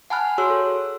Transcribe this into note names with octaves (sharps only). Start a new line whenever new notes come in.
F#5 G#5 A5 B5 F6 F#6
F#4 G#4 C#5 C6 E6 F#6
A4